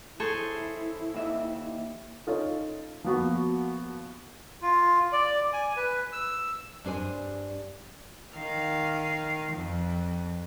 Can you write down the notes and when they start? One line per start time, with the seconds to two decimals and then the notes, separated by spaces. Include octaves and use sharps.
0.20 E4 G#4 A4 C5 C#5
1.14 D#2 E5
2.27 C#4 D#4 F4 A4
3.04 F3 A#3 B3 F#4
4.62 F4
5.12 D5
5.53 G#5
5.77 B4
6.12 E6
6.84 G2 D4 C5 G#5
8.35 D#3 F5
9.52 F2